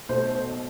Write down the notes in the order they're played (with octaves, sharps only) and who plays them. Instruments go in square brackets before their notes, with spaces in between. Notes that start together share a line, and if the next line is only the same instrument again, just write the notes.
[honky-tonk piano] B1 B2 A3 C5